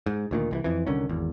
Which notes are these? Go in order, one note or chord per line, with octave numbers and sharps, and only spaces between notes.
G#2
D2 A#2 D#3
C2 D3 E3
F2 E3
C2 D3 D#3 C#4
G#1 E2